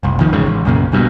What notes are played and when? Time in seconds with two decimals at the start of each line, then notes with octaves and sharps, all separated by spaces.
0.03 F#1 C2
0.20 D#2 D#3 F3
0.32 A#1 E2 G#2 C#3
0.46 A1
0.65 B1 F#2 A#2 C#3
0.92 G1 G2 B2